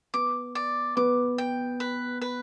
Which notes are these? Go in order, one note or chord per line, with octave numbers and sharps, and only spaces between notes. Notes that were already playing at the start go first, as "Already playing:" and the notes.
B3 D6
D5
B3 D6
G5
B4
B4